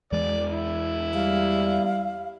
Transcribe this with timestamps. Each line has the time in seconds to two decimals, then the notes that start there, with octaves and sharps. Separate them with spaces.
0.12 E2 E3 G#3 D5
0.50 E4
1.14 G3 F5